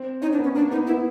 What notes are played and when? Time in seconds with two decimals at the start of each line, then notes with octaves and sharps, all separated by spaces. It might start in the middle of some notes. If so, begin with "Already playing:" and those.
Already playing: C4
0.22 C#4 D#4
0.30 C4 D4
0.39 B3
0.44 C#4
0.55 A#3 D4
0.71 B3 D#4
0.87 B3 E4